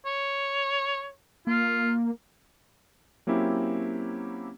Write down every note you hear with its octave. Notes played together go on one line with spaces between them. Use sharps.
C#5
A#3 F4
F#3 A#3 C4 C#4 E4 G4